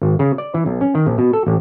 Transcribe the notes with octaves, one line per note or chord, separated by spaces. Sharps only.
G#1
C#3
D5
E3
B1
C#4
D#3
A#1
B2
A4
A1